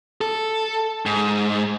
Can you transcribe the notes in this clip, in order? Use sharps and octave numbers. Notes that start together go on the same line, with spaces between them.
A4
G#2